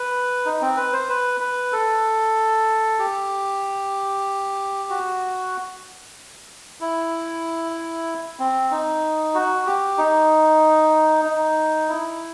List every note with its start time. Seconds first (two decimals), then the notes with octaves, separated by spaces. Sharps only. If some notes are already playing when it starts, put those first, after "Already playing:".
Already playing: B4
0.45 D#4
0.61 C4
0.77 B4
0.93 C5
1.09 B4
1.40 B4
1.72 A4
2.99 G4
4.90 F#4
6.81 E4
8.39 C4
8.71 D#4
9.35 F#4
9.66 G4
9.98 D#4
11.25 D#4
11.89 E4